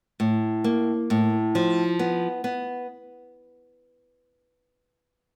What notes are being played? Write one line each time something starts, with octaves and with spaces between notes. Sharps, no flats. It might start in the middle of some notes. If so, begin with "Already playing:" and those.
A2
A#3
A2
F3
B3
B3